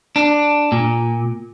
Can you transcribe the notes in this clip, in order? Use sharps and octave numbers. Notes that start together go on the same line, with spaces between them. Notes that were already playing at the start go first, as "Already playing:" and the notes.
D4
A#2